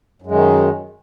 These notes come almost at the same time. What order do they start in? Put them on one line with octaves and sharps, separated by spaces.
F#2 G#3 D#3